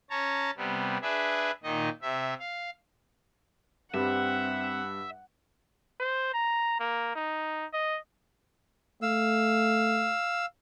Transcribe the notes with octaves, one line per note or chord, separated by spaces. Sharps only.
C#4 C#5 A5 A#5
C3 G3 B3
D4 G#4 B4 E5
A#2 D#3 D#4 D#5
C3 E5
F5
G2 G3 C4 E5 F#5
C5
A#5
A#3
D#4
D#5
A3 F5 E6